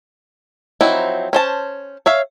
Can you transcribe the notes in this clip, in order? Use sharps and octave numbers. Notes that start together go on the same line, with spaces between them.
F3 F#3 C4 D#4 E4
C#4 C5 A5
C#5 E5 F5